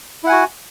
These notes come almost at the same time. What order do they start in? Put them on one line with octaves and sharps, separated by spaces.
E4 F#5 G#5 F#4